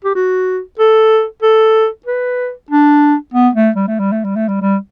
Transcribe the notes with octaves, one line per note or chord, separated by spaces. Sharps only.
G4
F#4
A4
A4
B4
D4
B3
A3
G3
A3
G3
A3
G3
A3
G3
G3